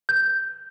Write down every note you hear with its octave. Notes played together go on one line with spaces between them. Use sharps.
G6